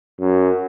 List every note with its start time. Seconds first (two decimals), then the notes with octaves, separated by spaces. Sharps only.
0.19 F#2